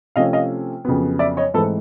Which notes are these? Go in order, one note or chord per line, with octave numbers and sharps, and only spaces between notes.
C3 F3 A3 C#4 D#5 F5
D#5 F5
F2 C#3 F#3 B3
D5 E5
C#5 D#5
G#2 E3 A3 C4 A4 B4